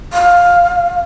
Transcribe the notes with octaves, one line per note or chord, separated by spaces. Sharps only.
F5